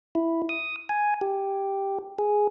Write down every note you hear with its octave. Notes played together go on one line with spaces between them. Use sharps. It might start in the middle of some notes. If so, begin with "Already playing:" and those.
E4
D#6
G#5
G4
G#4